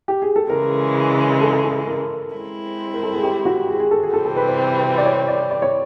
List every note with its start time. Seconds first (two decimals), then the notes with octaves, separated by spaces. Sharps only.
0.08 G4
0.22 G#4
0.36 A4
0.50 C#3 E3 G#3 A#4
1.41 A4
1.53 A4
1.64 A4
1.87 A#4
2.32 G#3 C4 E4
2.94 A#4
3.03 A4
3.13 G#4
3.23 G4
3.45 F#4
3.69 G#4
3.80 G#4
3.91 A4
4.03 G#4
4.14 C3 E3 G3 C4 A4
4.25 A4
4.36 B4
4.48 C5
4.98 D5
5.06 C#5
5.28 D5
5.51 D5
5.62 C#5